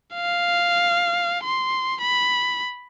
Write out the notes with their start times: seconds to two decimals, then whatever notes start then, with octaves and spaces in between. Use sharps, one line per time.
0.15 F5
1.43 C6
2.02 B5